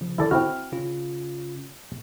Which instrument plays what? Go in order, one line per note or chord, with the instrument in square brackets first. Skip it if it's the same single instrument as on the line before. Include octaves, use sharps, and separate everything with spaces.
[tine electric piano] C#3 F3
[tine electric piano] D3 D#3 [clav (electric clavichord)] E4 A4 D5
[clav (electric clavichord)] C4 E4 F#4 [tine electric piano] F6
[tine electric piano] C#3 C#4 F4